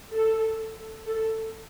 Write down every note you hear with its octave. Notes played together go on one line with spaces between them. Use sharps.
A4
A4